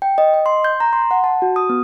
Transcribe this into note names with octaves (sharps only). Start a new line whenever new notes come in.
G5
D#5
D#5
C6
G6
A#5
C6
F#5
A5
F#4
D#6
B3